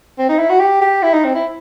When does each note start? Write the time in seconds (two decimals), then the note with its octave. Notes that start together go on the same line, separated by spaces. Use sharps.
0.19 C4
0.29 D#4
0.39 E4
0.50 F#4
0.60 G4
0.82 G4
1.03 E4
1.13 D#4
1.24 C4
1.35 E4